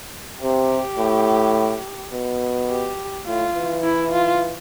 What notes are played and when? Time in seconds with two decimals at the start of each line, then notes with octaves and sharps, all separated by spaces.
0.42 C3 G4
0.99 A2
2.13 B2
2.70 G4
3.27 A2 F4
3.55 E3
3.84 E4
4.12 F4